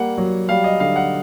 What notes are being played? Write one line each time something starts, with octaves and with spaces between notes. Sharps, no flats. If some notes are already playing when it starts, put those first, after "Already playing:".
Already playing: G3 A#3 F#5
F#3
G3 F5
D#5
D3 F5
F#5